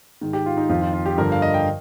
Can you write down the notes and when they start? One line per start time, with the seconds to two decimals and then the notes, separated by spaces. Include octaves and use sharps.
0.21 G#2 D#3
0.33 G4
0.46 F4
0.57 D#4
0.69 F2 D#3 F4
0.82 F4
0.93 F4
1.06 G4
1.17 G2 D3 F3 A#4
1.32 F5
1.42 D#5
1.54 G5